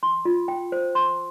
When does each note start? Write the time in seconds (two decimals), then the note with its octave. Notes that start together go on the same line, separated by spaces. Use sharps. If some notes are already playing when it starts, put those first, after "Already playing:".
0.03 C6
0.25 F4
0.48 G5
0.72 C5
0.95 C6